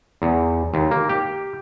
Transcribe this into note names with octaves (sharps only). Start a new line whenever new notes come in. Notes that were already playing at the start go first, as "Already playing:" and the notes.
E2
D#2
A#3
G4